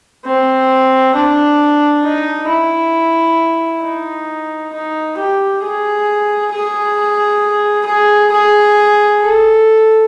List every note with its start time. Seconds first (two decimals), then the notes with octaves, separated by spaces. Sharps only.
0.25 C4
1.15 D4
2.03 D#4
2.48 E4
3.83 D#4
4.73 D#4
5.17 G4
5.63 G#4
6.51 G#4
7.86 G#4
8.31 G#4
9.20 A4